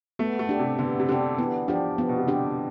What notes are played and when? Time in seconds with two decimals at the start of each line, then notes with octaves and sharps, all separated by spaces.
0.19 A3 B3
0.39 A3
0.49 D4 G4
0.59 C3
0.79 D3 B3
1.00 C3
1.09 D3 D4 G4
1.38 E3 B3
1.68 F3 D4 G4
1.98 F3 B3
2.09 B2
2.18 C3
2.28 D3 D4 G4